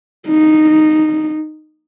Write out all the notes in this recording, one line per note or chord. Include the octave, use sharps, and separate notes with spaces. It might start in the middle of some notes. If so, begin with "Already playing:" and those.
D#4